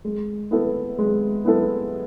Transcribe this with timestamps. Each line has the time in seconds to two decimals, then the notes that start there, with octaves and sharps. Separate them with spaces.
0.05 G#3
0.51 B3 E4 A4
0.98 G#3
1.45 B3 E4 A4